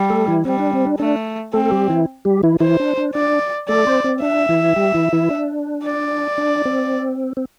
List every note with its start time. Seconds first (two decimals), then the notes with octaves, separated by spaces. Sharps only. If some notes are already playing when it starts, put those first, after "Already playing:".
Already playing: G3
0.10 A3 A4
0.27 E3 E4
0.45 G3 C4
0.59 D4
0.73 C4
0.87 D4
1.00 A3 D4
1.53 A3 C4 A4
1.66 A4
1.71 G3 G4
1.89 E3 E4
2.25 G3 G4
2.43 E3 E4
2.60 E3 E4 C5
2.80 D4
2.97 D4
3.15 D4 D5
3.68 A3 A4 D5
3.87 C4 C5
4.04 C4
4.22 D4 E5
4.49 E3 E4
4.76 G3 G4
4.94 E3 E4
5.13 E3 E4
5.30 D4
5.84 D5
6.38 D4
6.65 C4
7.37 C4